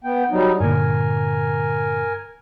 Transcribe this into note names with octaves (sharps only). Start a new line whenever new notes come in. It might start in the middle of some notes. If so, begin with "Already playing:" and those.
B3 G5
F#3 G3 D#4
G2 A#2 D3 A#4 G#5